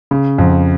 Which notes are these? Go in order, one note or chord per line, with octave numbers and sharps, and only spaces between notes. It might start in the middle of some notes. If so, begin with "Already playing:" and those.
C#3
F2